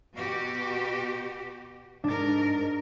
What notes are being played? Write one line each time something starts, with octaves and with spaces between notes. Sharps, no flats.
B2 F#4 G4
G#2 D4 A#4 A6